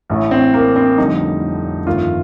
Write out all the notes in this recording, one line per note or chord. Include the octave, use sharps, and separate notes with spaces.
A1 A2 A3
C4
A#3
C4
F1 F2 D3 G3 D#4
G1 F2 D#3 A3 F4